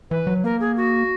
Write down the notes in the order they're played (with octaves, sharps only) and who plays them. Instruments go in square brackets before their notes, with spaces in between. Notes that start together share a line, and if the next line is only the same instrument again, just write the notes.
[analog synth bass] E3 [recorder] B4
[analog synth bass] F#3
[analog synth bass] A#3 [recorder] A#4
[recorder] G#4
F#4